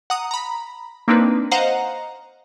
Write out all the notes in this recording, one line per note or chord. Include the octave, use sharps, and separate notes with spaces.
F#5 A#5 D#6
A#5 B5
A#3 C4 D4 D#4 B4
C5 D#5 F5 F#5 A#5